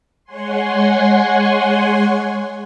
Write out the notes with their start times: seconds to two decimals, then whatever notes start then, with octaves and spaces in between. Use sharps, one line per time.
0.24 G#3 C#5 F#5 G#5 C6